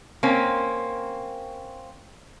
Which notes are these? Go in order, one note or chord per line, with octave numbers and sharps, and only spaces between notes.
A#3 C4 C#4